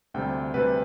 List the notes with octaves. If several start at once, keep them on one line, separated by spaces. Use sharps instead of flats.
D2 C3 G3 G5
D2 C3 G3 B4